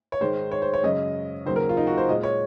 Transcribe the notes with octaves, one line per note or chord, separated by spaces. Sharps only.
C#5
G#2 D#3 G#3 C5
C#5
C5
C#5
F#2 C#3 G#3 D#5
D#2 C#3 F#3 A#3 C5
A#4
F4
D#4
F#4
C5
A#2 G#3 D#5
C#5